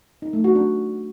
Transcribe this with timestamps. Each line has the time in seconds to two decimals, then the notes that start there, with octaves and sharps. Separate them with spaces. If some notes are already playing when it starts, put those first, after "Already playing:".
0.22 D#4
0.33 A3
0.44 F#4
0.55 D4